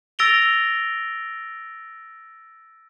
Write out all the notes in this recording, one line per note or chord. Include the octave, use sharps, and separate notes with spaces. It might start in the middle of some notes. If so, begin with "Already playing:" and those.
E6 A6 A#6 D7 F7 G7